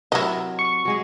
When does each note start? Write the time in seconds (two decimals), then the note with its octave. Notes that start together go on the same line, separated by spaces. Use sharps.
0.12 C3 F#3 E4 A#4 D#5
0.59 C#6
0.85 F#3 G#3 G#4